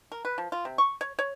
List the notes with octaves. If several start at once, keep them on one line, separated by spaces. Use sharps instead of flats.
A#4
B4
F3
F4
C3
C#6
C#5
C#5